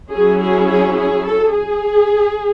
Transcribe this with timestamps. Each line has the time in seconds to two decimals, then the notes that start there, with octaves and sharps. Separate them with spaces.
0.12 F#3 C#4 E4 G#4
0.40 G#4
0.69 G#4
0.97 G#4
1.26 A4
1.54 G#4